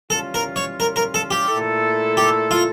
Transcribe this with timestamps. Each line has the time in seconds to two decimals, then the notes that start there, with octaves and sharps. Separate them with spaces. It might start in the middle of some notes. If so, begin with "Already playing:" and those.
0.10 E3 G3 C#4 F4 A4
0.34 A#4
0.56 C#5
0.80 A#4
0.96 A#4
1.14 A4
1.31 G4
1.49 A#2 A3 E4 A4
2.17 G4
2.51 F4